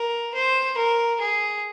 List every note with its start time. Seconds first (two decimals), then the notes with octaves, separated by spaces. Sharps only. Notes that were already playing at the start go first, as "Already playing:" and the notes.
Already playing: A#4
0.34 C5
0.77 A#4
1.21 G#4